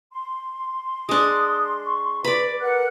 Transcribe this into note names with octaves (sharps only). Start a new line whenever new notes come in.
C6
G#3 D4 D#6
C#6
B4 D5 B5
A#4 B4 F#5 F#6